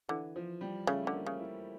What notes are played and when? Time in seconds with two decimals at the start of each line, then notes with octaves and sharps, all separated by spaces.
0.09 D3 E3
0.36 F3
0.61 G3
0.87 C#3 A3
1.03 D3 C#4
1.13 A#3
1.26 C#3
1.39 E4